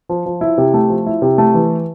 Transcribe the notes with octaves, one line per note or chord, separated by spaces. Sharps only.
F3
F3
E4
C3
A3
F3
E4
C3
A3
E3